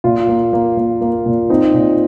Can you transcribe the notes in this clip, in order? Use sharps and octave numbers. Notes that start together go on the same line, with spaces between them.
A#2 F4
A#3
A#3
A#3
A#3
A#2
C4 D#4
A#2